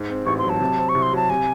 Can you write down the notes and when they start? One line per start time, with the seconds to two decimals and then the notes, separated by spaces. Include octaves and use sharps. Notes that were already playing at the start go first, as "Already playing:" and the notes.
Already playing: G#2
0.09 C4
0.26 A1 C#6
0.38 C6
0.44 F#3
0.49 A5
0.61 C3
0.77 C4
0.89 C#6
0.95 C2
1.02 C6
1.13 F#3 A5
1.30 C3 G#5